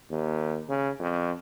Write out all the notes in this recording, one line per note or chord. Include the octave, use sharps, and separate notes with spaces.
D#2
C#3
F2